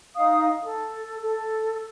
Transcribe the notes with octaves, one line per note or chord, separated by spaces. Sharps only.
D#4 F5 D#6
A4
A4